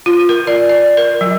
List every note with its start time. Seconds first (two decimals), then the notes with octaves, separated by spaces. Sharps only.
0.06 F4
0.29 A#4
0.47 D5
0.69 D5
0.97 A#4
1.21 F#3